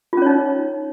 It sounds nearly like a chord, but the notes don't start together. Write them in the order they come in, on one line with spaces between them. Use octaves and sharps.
F4 C#4 C#5 D#4